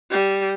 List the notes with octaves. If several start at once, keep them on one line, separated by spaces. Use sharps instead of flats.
G3